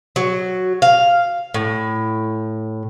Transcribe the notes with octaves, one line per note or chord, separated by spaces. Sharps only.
F#3
F5
A2